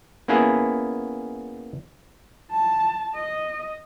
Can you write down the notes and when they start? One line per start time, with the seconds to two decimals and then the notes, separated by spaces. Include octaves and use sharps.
0.28 A#3 B3 C#4 E4 G#4
2.51 A5
3.15 D#5